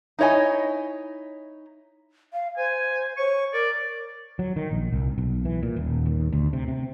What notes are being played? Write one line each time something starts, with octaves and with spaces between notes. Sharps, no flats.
D#4 E4 C#5 D#5 G#5
F5
C5 G#5
C#5 C#6
A#4 D5
F#3
D#3
A#1
C2
B1
E3
A#2
D#1
D#2
D2
C3
C3